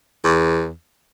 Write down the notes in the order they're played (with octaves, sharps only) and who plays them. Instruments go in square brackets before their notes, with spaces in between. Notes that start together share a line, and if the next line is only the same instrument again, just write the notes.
[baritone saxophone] E2